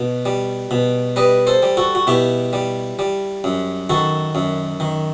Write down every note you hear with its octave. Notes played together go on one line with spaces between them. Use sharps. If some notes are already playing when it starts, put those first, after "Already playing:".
Already playing: B2
G3
B2
G3 B4 D#5
A4 C5
G3
F#4 A4
F#4
B2 E4 G4
G3
G3
F#2
D#3 F#4 A4
F#2
D#3